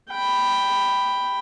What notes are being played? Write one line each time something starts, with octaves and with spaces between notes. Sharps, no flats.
G5 B5